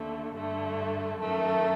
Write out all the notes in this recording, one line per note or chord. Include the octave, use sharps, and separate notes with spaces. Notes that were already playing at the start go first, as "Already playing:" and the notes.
Already playing: D#2 D3 A3
G2 D3 A3
F#2 D#3 A3